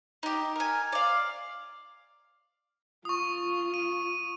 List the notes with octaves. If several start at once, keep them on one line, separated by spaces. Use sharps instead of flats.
D#4 G4
A#4 G#5
D5 F5
F4 C#6 D#6
D#7